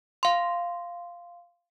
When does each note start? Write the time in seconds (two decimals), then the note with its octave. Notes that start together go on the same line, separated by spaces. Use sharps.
0.23 F5 C6